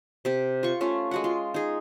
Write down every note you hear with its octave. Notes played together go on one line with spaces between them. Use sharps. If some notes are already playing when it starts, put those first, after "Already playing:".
C3 G4
F4 C#6
A3 C#4 F4
G#3 F#4 F#5
F4
D#4 G#4